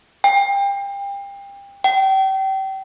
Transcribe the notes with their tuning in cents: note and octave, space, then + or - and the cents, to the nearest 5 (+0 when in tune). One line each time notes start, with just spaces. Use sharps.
G5 +30
G5 -30